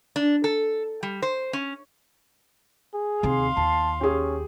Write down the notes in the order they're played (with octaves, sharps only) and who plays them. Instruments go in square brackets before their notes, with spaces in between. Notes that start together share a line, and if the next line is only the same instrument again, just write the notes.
[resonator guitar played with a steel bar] D4
A4
G3
C5
C#4
[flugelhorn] G#4
[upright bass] D#2 C3 [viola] F5 C6
[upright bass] D#2 [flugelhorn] A5
[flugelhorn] C#4 [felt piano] G4 G#4